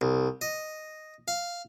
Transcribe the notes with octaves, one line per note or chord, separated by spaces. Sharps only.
C2
D#5
F5